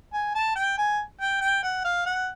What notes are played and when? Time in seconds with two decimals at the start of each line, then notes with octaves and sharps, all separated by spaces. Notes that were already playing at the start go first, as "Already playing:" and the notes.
0.13 G#5
0.35 A5
0.56 G5
0.78 G#5
1.21 G5
1.41 G5
1.63 F#5
1.85 F5
2.06 F#5